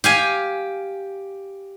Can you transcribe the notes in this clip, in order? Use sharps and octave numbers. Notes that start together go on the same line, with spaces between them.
G4 F5 G#5